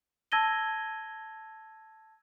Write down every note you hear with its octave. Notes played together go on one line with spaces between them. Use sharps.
A5 E6 G#6 A#6 D#7 G7